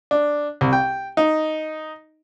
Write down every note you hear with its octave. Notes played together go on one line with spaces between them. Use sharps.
D4
C2
G5
D#4